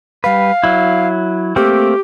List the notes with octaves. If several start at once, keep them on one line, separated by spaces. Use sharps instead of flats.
G3 B4 F5
F#3 E4
A3 A#3 C4 G4